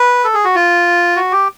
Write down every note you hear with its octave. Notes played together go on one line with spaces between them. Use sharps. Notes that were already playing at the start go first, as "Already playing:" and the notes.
Already playing: B4
A4
G#4
F#4
F4
F#4
G4